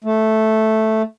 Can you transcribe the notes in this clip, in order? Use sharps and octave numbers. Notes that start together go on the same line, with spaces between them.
A3